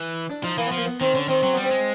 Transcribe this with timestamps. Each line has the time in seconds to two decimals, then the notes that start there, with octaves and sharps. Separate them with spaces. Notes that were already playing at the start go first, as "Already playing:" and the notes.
Already playing: E3
0.30 D4
0.44 F3 D#4
0.57 E3 A#3
0.67 B3
0.72 F3
0.77 A#3
0.86 B3
1.01 D#3 C4
1.14 D3 C#4
1.29 D#3 C4
1.43 F#3 C4
1.54 G3 B3
1.64 C4
1.71 G#3